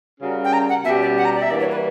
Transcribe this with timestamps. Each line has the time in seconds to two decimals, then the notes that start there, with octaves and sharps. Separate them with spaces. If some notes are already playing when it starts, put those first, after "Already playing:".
0.20 C#3 G3 C#4 F#4 A#4
0.44 G5
0.53 A#5
0.69 F#5
0.85 B2 G3 C#4 G4 E5
1.02 D5
1.17 F#5
1.25 A#5
1.34 D5
1.42 E5
1.50 E3 G3 A#3 D4 F#4 D5
1.60 C#5
1.71 B4